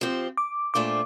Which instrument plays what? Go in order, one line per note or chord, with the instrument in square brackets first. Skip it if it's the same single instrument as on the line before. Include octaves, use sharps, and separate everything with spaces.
[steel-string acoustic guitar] F3 C4 G4
[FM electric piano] D6
[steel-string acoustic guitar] A#2 A3 D4 F4 C5 [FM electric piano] D6